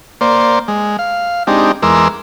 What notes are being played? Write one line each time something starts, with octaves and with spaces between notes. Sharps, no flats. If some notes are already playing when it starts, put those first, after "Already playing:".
A#3 C5 D5
G#3
F5
G#3 C4 D4 D#4 G4
E2 G#3 A#4 C6 D6 E6